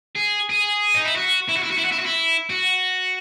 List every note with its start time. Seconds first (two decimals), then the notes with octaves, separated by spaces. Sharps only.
0.15 G#4
0.49 G#4
0.94 D#4
1.05 E4
1.16 F#4
1.49 E4
1.56 F#4
1.63 E4
1.71 F#4
1.78 E4
1.85 F#4
1.92 E4
1.99 F#4
2.06 E4
2.50 F#4